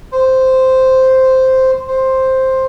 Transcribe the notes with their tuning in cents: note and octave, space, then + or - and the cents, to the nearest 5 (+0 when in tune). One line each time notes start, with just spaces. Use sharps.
C5 -5
C5 +5